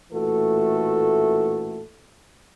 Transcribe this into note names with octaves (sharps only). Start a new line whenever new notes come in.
A1 A#2 E3 A3 F#4 A4